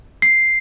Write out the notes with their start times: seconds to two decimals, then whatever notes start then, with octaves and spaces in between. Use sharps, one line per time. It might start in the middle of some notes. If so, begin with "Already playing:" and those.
0.22 C7